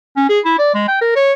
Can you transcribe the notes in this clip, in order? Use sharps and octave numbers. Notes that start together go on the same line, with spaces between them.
C#4
G#4
E4
D5
G#3
G5
A#4
C#5